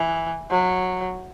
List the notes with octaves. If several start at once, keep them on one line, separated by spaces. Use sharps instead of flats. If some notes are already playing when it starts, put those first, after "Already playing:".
Already playing: E3
F#3